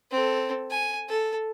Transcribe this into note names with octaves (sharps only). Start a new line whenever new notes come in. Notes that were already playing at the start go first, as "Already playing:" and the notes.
C4 A4
G#5
A4